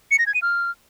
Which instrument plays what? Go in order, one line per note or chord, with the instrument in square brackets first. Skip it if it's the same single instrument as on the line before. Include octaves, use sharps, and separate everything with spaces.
[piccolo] C#7
A#6
G#6
D#7
F6